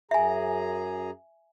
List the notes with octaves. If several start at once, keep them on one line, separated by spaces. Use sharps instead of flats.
F#2 G#4 E5 G#5 A#5